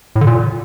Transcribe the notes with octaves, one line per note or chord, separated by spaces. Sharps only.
A2
D3
A#2